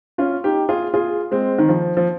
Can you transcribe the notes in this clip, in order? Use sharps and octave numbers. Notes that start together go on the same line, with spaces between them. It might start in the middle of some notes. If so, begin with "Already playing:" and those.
C#4 F4
D#4 G4
F4 G#4
F4 G#4
G#3 C4
D#3
F3
F3